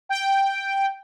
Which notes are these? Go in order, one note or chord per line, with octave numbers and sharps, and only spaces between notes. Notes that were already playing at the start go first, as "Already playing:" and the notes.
G5